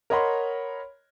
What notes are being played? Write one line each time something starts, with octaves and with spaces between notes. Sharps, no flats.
A#4 C#5 D#5 F#5 B5 C6